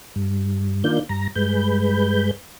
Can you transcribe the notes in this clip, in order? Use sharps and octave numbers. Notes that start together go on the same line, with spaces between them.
G2
D#3 A#3 D4 F4 G6
G2 A#5
G2 G#3 B4 G6